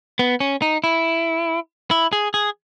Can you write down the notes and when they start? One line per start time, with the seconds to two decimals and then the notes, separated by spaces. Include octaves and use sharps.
0.19 B3
0.40 C#4
0.62 D#4
0.84 E4
1.91 E4
2.13 G#4
2.34 G#4